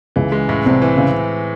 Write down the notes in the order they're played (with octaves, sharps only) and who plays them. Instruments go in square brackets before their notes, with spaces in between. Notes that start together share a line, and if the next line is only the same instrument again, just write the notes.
[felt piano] C#2 C#3 [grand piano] E3
[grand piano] G#3
A2
[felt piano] C2 C3 [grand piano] C4
[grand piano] E3
[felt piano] C#3